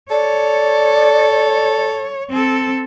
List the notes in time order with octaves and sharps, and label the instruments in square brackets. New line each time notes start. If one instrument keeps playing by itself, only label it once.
[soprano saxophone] A4 [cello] C#5 [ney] D5
[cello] C4 A4